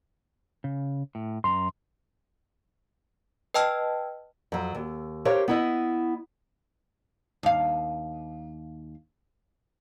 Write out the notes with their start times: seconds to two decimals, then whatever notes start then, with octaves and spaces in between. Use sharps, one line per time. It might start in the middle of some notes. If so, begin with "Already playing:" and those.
0.64 C#3
1.15 A2
1.44 F#2 A#5 C6
3.54 B4 D#5 G5 A5 E6 F6
4.52 F2 F#3
4.75 D#2
5.25 G4 A#4 C5 C#5 F5
5.48 B3 E4 D#5
7.43 D#2 F5